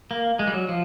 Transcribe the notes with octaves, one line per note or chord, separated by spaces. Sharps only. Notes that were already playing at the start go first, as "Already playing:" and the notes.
A#3
G#3
G3
F#3
F3